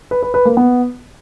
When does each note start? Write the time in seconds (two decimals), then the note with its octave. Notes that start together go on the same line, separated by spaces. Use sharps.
0.11 B4
0.23 B4
0.34 B4
0.45 A#3
0.57 B3